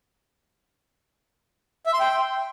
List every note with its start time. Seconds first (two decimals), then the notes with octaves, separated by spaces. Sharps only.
1.86 E5
1.93 C6
2.00 G5